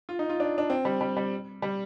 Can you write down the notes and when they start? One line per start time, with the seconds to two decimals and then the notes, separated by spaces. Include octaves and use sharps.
0.09 F4
0.19 D#4
0.29 F4
0.40 D4
0.58 D4
0.70 C4
0.85 G3
1.01 G3
1.17 G3
1.62 G3